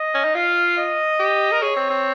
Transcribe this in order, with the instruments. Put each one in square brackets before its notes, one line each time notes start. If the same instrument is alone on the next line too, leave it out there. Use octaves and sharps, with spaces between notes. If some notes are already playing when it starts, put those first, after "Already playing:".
Already playing: [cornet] D#5
[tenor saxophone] C#4
D#4
[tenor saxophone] F4 [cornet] F5
[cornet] D#5
[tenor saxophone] G4
A#4
[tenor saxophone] G#4 [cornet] C#5
[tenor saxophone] C4
C4